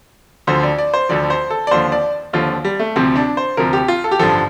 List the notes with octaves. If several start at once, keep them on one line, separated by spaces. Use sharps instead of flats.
D2 D3 F3 C5
D5
D5
C5
D2 D3 F3 D5
C5
A4
D5
D#2 D3 F3 C5
D5
D#2 D3 F3 F4
G3
A3
D2 C3 F3 C4
D4
C5
D2 C3 F3 A#4
G4
F4
A4
G4
A1 G2 D3 F3 A4